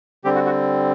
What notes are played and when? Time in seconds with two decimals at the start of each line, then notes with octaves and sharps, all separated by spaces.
0.24 D3 G3 C4 G4
0.35 F#4
0.45 F#4